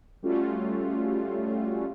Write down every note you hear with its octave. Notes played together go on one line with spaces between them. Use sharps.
G3 A3 C#4 F4 F#4